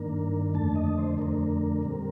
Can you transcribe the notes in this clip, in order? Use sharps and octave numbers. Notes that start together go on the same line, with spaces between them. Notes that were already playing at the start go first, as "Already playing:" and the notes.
Already playing: G2 D#3 A#3 D4 A#4
F2 D3 A3 D4 A5
D#5
C5
F2 D3 A3 D4 A#4
A#2 G3 C4